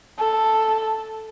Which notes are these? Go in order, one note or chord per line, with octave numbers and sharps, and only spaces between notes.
A4